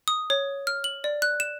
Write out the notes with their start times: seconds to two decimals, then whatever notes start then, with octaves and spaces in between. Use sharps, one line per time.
0.08 D#6
0.30 C#5
0.67 F6
0.84 F#7
1.04 D5
1.22 F#6
1.40 E7